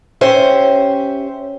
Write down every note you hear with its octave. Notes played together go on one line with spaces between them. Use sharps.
C#4 G4 C5 E5